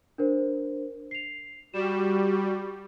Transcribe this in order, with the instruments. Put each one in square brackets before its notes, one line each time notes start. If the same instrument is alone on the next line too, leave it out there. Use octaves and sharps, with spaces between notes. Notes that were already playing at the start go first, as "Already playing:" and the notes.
[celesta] D4 A#4 C5
C7 F7
[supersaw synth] G3 [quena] F#4 [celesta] E7